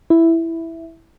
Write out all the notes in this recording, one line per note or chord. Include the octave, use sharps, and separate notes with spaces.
E4